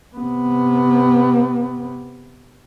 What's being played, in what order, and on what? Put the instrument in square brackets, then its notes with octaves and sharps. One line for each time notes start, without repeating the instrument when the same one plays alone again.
[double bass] C3 B3